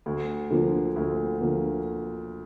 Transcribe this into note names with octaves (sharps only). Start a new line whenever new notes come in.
D2
D3 F3 A#3
D2
D3 F3 A#3